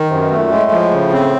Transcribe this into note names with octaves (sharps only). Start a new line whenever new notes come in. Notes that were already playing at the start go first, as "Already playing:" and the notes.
Already playing: D#3
F#2 C3
B2
A3
A#2
A2 G#3
F3
C#3
C4